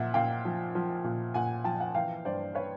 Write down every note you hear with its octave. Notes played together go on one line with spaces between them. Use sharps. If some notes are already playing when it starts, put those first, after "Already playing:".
Already playing: A#2 F3 E5 F#5
A#2 F5 G5
F3
F3
A#2
A#2 F#5 G#5
F3 G5 A5
F#5 G#5
E3 F5 G5
G2 C5 D5
B4 C#5